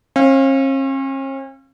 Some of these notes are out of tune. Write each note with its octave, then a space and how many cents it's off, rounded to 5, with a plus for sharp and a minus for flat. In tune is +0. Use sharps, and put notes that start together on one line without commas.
C#4 -45 F5 +0